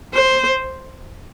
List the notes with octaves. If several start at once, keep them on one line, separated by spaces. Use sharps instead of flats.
C5